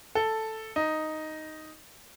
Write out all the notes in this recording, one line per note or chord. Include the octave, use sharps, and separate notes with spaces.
A4
D#4